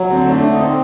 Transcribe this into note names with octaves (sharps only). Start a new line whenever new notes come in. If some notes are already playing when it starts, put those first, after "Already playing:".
Already playing: F#3
D3 C4
A3
D4
D3
D#4
C4